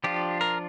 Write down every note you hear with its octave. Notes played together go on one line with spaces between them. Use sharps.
F3 D4 F4 G4
A#4